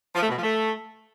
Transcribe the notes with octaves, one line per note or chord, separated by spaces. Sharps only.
F3
A3
B2
F3
A3